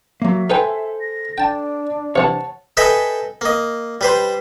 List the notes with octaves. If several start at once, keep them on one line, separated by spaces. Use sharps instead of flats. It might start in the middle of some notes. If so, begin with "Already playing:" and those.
F#3 A#3 E5
D#4 A4 B4 C5 G5 G#5
A#6
D4 G5 A5
C3 E3 C#5 F#5 A5
A4 B4 D#5 E5 G5 G#5
A#3 D#5
G3 B4 C5